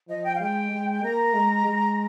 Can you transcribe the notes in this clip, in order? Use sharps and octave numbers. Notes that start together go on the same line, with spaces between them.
F3 D#5
G5
F5
G#3 G5
G#3
A#3 A#5
G#3
G#3